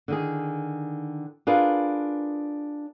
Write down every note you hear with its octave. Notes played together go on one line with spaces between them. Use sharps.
D3 D#3 G#4
D4 F4 G#4 A#4 B4